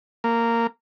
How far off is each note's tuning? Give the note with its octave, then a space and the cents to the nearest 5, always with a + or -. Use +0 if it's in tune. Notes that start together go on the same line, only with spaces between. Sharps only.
A#3 -10